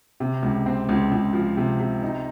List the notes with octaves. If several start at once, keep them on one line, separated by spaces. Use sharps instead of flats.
C3
C#2
C4
C#2
C#2
F3
C3
C3
D#4